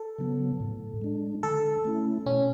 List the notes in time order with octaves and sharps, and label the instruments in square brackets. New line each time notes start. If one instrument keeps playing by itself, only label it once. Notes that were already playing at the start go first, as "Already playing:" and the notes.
Already playing: [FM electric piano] A4
[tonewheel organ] C#3 F#3 B3
A2
G#3 D4
[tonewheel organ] D3 [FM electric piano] A4
[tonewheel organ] A3 C#4 E4
[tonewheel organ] B2 [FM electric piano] C#4